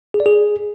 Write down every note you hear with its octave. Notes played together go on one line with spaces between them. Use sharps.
G#4
D5
G#4